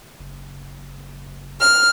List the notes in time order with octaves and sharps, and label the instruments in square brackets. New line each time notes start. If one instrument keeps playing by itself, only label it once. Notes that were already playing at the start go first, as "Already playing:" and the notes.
[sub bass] F#1
[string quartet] F6